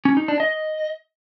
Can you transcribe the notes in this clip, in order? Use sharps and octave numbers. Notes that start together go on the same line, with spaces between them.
C#4
D#4
D4
D#5